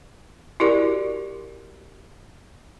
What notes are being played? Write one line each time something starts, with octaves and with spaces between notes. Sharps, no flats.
E4 F#4 G4 A#4 D5